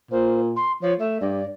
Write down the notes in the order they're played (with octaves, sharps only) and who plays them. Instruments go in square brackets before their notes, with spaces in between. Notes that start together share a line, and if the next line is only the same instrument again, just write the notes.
[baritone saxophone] A#2 [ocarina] C5
[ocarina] C6
[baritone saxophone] F3 [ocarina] C#5
[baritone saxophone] A3 [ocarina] E5
[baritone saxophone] G2 [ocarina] D5